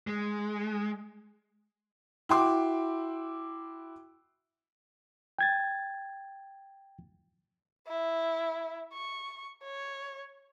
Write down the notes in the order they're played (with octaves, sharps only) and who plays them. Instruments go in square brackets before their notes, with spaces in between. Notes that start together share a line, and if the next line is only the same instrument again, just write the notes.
[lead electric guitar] G#3
[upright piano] E4 F#4 G5 C6 D6
[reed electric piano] G5 G#6 A6
[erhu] E4
C#6
C#5